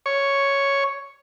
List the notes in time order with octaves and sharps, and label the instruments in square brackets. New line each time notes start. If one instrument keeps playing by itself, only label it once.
[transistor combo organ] C#5